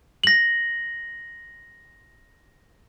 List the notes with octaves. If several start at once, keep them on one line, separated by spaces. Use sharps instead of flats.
A#6 F#7